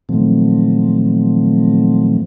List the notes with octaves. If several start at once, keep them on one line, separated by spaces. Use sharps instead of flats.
A#2 D#3 F3 F#3 A3 C4